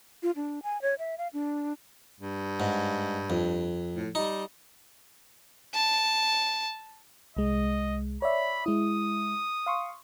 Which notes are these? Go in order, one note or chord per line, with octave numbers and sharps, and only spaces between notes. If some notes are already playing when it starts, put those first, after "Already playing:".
F4
D4
G#5
C#5
E5
F5
D4
G2
G#2
F2
A2
G3 D#4
A5
C2 G#3 D#5
C#5 D5 E5 B5
G#3 E4 D#6
F5 C6 C#6